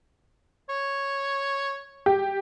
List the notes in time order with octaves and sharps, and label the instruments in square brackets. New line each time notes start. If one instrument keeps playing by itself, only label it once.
[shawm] C#5
[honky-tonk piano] G4